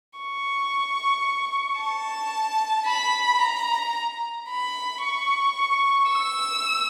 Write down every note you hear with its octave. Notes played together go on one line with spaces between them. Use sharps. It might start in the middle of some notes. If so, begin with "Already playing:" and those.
C#6
A5
B5
A#5
B5
C#6
E6